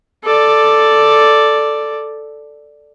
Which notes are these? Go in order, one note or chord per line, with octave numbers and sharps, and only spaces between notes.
A4 D5